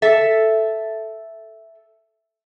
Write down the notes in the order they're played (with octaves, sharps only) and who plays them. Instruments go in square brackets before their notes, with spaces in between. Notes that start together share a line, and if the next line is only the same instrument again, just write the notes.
[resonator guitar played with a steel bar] A4 E5